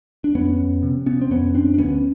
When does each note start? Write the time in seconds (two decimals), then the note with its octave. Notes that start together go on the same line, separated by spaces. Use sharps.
0.24 D4
0.35 F2 B3 C#4
0.59 F2
0.83 C3
1.06 C3 B3 C#4
1.21 C4
1.30 F2 B3 C#4
1.55 F2 C4 D4
1.74 D4
1.78 D2 B3 C#4